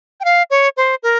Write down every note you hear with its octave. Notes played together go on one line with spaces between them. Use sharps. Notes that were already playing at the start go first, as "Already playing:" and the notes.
G5
F5
C#5
C5
A#4